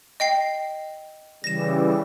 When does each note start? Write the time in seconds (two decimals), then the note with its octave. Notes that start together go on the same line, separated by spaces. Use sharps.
0.20 D#5 G5 C7
1.44 C#3 E3 G3 A#6 E7